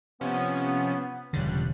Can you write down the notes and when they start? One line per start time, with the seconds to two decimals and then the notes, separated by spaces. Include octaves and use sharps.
0.21 C3 F3 B3 C#4
1.33 E1 C#2 D3 G3 F#6